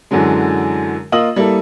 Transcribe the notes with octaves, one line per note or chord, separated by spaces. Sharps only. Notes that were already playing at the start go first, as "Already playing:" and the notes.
F#2 D3 E3 F#3 G#3
A#3 F4 D#5 D#6 E6 F#7
G3 A#3 E4 A4